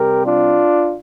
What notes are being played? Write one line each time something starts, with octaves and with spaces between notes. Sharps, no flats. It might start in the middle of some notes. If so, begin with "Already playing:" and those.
Already playing: C3 G3 C4 G4 A#4
D4 F4